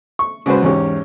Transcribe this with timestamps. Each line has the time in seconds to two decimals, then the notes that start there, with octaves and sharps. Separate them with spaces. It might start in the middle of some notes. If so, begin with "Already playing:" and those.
0.19 C#6
0.46 C#3 G#3 F#4 B4 C5
0.63 E2 G#2 C#4 G4